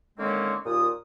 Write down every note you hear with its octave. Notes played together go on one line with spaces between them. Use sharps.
D3 D#3 G#3 A#3 C4 C#4
D#2 A#2 F4 D#6